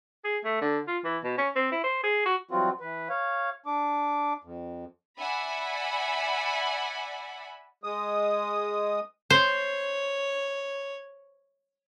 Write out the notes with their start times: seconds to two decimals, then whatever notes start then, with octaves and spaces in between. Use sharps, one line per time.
0.24 G#4
0.44 A3
0.61 D3
0.88 F4
1.04 E3
1.24 B2
1.38 C#4
1.56 C4
1.72 E4
1.84 C5
2.03 G#4
2.25 F#4
2.51 E3 F#3 G3 C4 F4 F#4
2.81 E3 B4
3.10 C#5 F5
3.66 D4 D6
4.44 F2
5.18 D5 E5 F#5 G#5 B5
7.84 G#3 D#6
9.30 C5 C#5